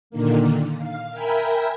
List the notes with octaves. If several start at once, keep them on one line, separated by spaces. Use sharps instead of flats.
A#2 D3 D#3 A#3
F5
A#4 E5 G5 G#5 A#5 B5